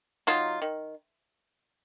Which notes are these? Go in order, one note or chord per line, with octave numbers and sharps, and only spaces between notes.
F#3 D#4 F4
D#3